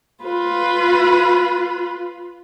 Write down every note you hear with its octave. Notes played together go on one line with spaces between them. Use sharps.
F4 B4